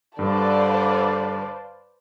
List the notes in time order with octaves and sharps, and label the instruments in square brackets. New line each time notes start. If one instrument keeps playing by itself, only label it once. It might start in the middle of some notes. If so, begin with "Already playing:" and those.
[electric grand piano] G2 [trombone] D3 [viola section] B4 C5 D5 [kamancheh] F5 A5